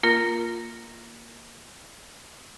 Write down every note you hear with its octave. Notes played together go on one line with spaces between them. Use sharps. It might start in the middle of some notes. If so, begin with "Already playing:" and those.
A#3 F4 A#4